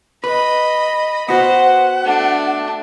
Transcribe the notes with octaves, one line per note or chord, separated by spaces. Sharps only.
B4 D#5 B5
B3 F#4 C5 F#5
A3 D4